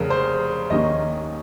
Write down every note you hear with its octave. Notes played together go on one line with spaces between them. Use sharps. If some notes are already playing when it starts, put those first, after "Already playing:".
Already playing: F1 C#3 A#4
C5
D#2 D#3 A#3 C#4 D#5